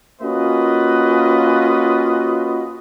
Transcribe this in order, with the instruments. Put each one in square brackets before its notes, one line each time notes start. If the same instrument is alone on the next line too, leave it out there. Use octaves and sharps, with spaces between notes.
[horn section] A#3 C#4 F4 F#4 B4 D#5